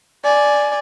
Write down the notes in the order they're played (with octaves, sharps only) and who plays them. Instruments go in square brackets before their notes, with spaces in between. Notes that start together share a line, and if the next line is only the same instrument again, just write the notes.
[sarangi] D5 [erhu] G#5